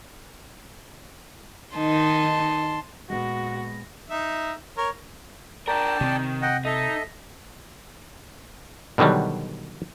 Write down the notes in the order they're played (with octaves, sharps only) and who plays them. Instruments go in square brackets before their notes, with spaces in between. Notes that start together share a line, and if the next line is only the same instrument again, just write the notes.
[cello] D#3 D#4 [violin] A5 C6
[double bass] A#2 [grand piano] G#3 B3 [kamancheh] F#4 [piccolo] A#6
[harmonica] D#4 E5
A#4 C#5
[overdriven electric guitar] D4 A#4 [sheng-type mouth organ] D5 G5 A5
[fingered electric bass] C3 C4 [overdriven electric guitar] D#3
[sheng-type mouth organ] D#5 F#5 G5
[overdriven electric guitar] D#4 [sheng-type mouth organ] A4 D#5 E5
[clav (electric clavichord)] B2 D3 D#3 F#3 G3